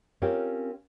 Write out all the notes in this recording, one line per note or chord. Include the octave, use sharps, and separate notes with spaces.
C4 C#4 F4 G4 A#4 C#5